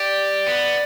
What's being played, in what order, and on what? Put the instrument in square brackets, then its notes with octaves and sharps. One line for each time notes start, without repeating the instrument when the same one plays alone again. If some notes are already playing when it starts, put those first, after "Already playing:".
Already playing: [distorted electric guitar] G4 [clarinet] D5
[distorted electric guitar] B3